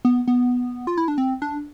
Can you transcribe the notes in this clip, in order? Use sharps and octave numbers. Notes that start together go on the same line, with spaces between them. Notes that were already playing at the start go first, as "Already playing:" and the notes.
B3
B3
F4
E4
D4
C4
D4